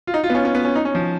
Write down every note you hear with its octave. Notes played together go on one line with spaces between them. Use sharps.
F4
D#4
F4
B3
C#4
C#4
B3
C#4
D#4
C#4
F3